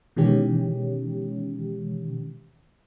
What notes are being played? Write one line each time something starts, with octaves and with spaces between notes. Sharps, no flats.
B2 D#3 E3 G#3 C#4 G4